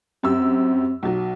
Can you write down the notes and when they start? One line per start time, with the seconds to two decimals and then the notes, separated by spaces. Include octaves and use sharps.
0.24 F#2 C4 G4 E6
1.03 B1 F#3